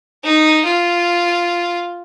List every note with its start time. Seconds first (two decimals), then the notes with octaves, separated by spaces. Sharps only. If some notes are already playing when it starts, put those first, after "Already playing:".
0.24 D#4
0.65 F4